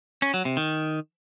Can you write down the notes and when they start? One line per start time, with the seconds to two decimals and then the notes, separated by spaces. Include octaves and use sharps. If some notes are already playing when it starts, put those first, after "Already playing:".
0.22 C#4
0.34 F#3
0.45 C3
0.57 D#3